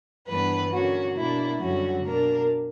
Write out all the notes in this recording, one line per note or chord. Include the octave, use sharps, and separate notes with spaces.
G2 E3 G3 B3 D4 B4
D3 A#3 C#4 F#4
B2 A#3 D4 E4
F#2 D3 G3 C#4 F#4
B2 A#3 D4 A#4